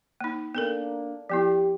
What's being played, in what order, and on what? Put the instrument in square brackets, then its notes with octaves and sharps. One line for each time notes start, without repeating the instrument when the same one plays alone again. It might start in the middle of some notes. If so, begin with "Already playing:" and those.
[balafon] A#3 D#4
[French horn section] A#3 D4 [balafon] B3 A4 A#4
[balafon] F3 B3 E4 [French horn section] G4